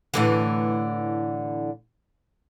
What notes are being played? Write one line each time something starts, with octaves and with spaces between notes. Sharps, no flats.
A2 D3 E3